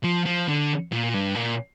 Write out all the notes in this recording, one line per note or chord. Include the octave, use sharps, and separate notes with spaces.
F3
F3
D3
A#2
G2
A#2